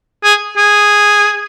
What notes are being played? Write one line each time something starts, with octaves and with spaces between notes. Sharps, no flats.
G#4
G#4